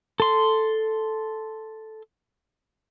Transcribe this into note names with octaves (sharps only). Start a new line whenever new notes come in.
A4 C6